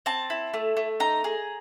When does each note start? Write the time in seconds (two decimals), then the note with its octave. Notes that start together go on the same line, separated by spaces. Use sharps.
0.06 C4 A5
0.30 E4
0.54 A3
0.77 A3
1.00 D#4 A#5
1.24 G#4